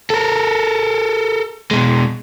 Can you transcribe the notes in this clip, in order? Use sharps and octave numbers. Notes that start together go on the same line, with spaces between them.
A4 A#4
B2 G#3